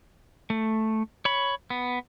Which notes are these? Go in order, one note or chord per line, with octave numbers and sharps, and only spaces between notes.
A3
C#5 B5
B3